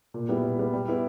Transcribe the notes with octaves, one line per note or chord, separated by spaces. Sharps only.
A#2
G3 B3 E4
A#2
G3 B3 E4
G3
B3 E4